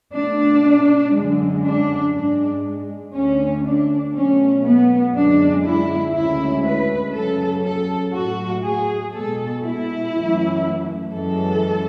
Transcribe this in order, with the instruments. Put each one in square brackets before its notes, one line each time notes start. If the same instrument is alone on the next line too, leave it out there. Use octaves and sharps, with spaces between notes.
[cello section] B2 A3 D4
F#2 D3 G#3
D4
G#2 G#3 D4
D2 D3 A3 C#4
D4
B2 F#3 A3 C#4
B3
F#2 D3 G#3 D4
E4
D2 C#3 G#3 E4
B4
F#2 C#3 F#3 A4
A4
A2 F#3 A3 F#4
G#4
B2 G#3 A4
E4
F#2 E3 A3
F#2 E3 G#3 A4